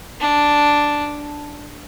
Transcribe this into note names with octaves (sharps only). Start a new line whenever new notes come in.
D4